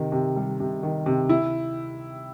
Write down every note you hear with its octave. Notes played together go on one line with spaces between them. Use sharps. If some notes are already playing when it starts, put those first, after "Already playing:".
Already playing: C3 D#3
C3
G3
C3
D#3
C3
E4